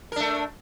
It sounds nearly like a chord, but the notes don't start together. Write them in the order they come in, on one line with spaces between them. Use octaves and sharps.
A#4 D4 A3